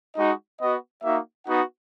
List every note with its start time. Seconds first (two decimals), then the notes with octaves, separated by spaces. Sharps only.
0.16 G#3 D#4 F#4 D#5
0.59 B3 F#4 D#5
1.03 A#3 D#4 F#4 E5
1.46 B3 D#4 F#4 F#5